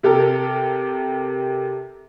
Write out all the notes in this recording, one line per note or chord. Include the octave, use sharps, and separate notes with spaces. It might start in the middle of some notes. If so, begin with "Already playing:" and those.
C3 G4 A4 A#4